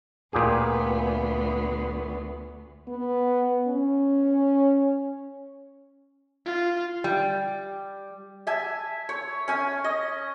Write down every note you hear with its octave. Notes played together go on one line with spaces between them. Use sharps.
D2 A#2 B3 G4 G#4
B3
C#4
F4
G3
E5 G#5 A5
C#5
C#4 G#5
D#5